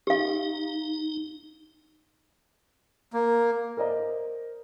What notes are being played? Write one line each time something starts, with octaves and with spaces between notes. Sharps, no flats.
D#4 G4 F5
A#3
A#4 C5 D5 D#5 A#5